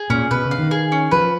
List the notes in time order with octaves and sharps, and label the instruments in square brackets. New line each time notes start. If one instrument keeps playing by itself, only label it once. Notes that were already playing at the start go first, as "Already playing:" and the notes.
Already playing: [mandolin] G#4
[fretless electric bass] A#2 [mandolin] C#4
[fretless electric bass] B2 [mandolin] B4
[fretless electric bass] C#3
[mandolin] F5
[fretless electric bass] D#3
[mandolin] G#4
C#4
[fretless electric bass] F3 [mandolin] B4